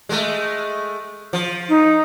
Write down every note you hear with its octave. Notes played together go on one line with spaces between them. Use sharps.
G#3 A3
F3
D#4